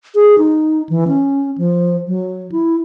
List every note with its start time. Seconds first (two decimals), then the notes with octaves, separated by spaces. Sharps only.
0.15 G#4
0.38 D#4
0.89 E3
1.08 C#4
1.58 F3
2.07 F#3
2.52 E4